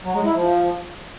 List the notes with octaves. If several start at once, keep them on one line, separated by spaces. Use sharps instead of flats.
F#3
G#3
E4
F3